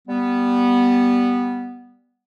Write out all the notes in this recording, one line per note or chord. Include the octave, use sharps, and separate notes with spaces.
G3 B3